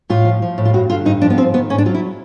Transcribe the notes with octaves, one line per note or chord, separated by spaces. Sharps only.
A2 F4
F3
F3
A2
F4
G2 F#4
D3 F4
G2 D#4
F3 D4
B3
G#2 C4
D#3 B3
G#2 C#4
D4
F#3 F4
E4